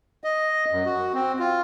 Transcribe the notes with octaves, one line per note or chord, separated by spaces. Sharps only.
D#5
F#2
F#4
C4
F4